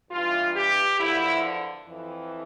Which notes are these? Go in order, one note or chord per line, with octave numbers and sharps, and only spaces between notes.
G2 E3 F4
G4
E2 D3 F3 E4
F2 E3